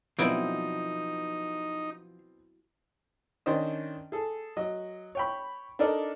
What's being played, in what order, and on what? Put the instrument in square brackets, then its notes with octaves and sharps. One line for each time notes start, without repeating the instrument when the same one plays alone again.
[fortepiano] B2 B3 C4 [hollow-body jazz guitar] F3 [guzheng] F#3 E4 D5 [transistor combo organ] D#4
[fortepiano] D#3 C#4 D4 C5 D#5
G#4 A4
F#3 D#5
C#5 G5 B5
D4 D#4 A4 A#4 D5 D#5